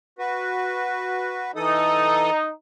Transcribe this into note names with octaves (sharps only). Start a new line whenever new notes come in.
F#4 B4
E3 D#4 A4 D#6